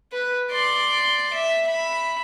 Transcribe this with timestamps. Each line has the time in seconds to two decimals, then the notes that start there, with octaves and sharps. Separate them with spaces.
0.12 B4
0.51 D5 C6
1.33 E5
1.67 E5 B5